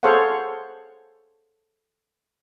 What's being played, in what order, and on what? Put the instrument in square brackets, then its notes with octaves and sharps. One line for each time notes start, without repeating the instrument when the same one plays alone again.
[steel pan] G#4 A4 C5 C#5 F5 F#5